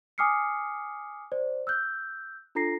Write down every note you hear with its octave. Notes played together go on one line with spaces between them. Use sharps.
G#5 D6 D#6 F6 C7 C#7
C5 D5
E6 F#6 G6
D4 F4 A4 A#5 A#6 C7